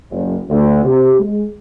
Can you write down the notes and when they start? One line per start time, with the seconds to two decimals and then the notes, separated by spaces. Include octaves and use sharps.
0.11 F#1
0.49 D2
0.84 C3
1.19 G#3